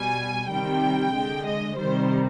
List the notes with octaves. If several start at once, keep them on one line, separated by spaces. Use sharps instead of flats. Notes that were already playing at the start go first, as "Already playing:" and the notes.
Already playing: B2 G3 G#5
C3 D#3 G3 G5
D3 G#3
D#5
C3 D#3 G3 C5